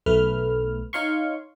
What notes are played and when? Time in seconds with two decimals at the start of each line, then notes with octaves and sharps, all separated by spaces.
0.06 B1 A3 B4 F6
0.93 D#4 C#5 F5 C6 C#6